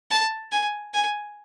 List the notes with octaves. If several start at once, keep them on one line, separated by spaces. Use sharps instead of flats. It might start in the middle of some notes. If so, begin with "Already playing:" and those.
A5
G#5
G#5